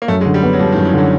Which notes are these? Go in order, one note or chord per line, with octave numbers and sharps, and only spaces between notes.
A#3
F#2 A3
G#3
D3
G3
B3
F#3
F3 G3
D#3
F#2
E3
D3 F#3